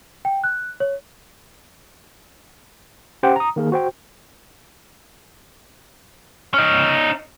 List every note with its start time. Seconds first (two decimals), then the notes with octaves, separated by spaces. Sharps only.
0.25 G5
0.44 F#6
0.80 C#5
3.23 C#4 G4 C5 F#5 G5
3.36 A#5 D#6
3.56 D#3 A#3 G#4 A#4
3.72 F#4 C5 G5
6.54 C#4 D#4